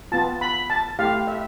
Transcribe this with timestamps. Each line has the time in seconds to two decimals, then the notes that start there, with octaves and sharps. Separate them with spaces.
0.12 B3 F4 A5
0.41 B5
0.70 A5
0.99 A3 E4 G4 F5
1.27 E5